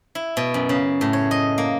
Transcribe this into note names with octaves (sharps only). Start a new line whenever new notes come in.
E4
B2
F#2
C#3
A2
C#5
D#5
A#3